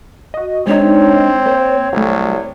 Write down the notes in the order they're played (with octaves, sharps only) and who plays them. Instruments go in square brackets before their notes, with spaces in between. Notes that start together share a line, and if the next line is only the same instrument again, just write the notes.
[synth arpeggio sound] F#4 D#5
[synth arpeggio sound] G#3 D4 D#4 [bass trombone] C4 [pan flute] C#5
[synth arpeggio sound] A#3 C5
[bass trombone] C2 [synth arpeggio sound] F#3 A3